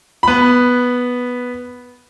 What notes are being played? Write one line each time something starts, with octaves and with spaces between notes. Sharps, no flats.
B3 B5